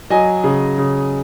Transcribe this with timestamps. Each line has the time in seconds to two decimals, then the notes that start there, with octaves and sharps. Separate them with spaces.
0.10 F#3 D#5 G#5
0.44 C#3
0.78 C#3